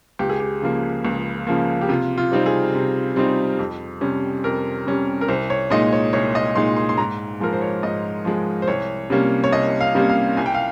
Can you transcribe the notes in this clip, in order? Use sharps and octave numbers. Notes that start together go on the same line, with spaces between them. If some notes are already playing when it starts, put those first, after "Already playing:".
C#2 G4
G#4
G4
C#3 F3 A#3
C#2
C#3 F3 A#3
G4
C3 F4
F4
G3 C4 D#4
G#4
C3
G3 C4 D#4
F2
C3 G3 C#4
F2 A#4
C3 G3 C#4
A#4
C2 C5
C#5
A#2 G#3 D#4 D#5
C#5
C2 C#5
D#5
A#2 G#3 D#4 C6
C6
C6
G#2 A#5
F3 G#3 A#4
C5
C#5
G#2 D#5
F3 G#3
C5
C2 C#5
C3 G3 A#3 C#4
C#5
C2 D#5
F5
C3 G3 A#3 C#4
F5
C2 G#5
G5
F5